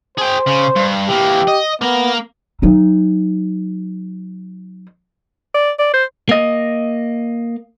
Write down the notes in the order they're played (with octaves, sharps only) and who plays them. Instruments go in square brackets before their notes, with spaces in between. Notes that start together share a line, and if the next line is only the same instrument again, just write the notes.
[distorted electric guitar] G#4 G5 [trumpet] C5
[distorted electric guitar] C#3
G2
[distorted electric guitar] E3 A#3 [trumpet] G4
[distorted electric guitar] D#5
[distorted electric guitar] A#3 A#4 [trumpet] B3
[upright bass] F#3 D#4
[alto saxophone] D5
D5
C5
[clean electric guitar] A#3 D#5